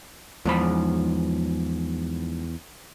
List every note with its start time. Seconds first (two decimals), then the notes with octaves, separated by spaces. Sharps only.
0.45 E2 G#2 F3 B5